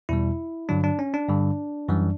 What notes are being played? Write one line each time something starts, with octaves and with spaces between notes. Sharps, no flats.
E2 B2 G3 E4
G2 D3 F#3 D4
D4
C#4
D4
G2 D3 G3
F#2 E3 G3